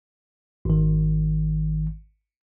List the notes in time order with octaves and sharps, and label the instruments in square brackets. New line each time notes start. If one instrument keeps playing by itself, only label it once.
[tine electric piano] G#1 D#3